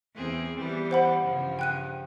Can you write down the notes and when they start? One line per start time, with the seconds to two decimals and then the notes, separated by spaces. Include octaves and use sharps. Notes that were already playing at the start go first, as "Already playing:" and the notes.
0.14 E2 C4 G#4
0.56 E3 G3 B3
0.91 C5 F#5 B5
1.22 G2 C#3 F3
1.59 G5 F#6 D#7